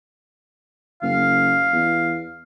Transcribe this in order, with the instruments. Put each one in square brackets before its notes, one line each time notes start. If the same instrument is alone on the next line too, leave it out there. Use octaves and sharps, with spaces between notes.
[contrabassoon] F#1 [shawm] F5
[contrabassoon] E2